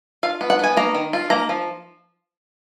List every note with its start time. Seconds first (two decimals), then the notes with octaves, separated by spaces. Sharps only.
0.23 F4 F5
0.41 B3
0.50 F#5
0.59 B3 G#5
0.77 A#3 A#5
0.95 D#3
1.13 F4
1.30 A#3 A#5
1.49 F3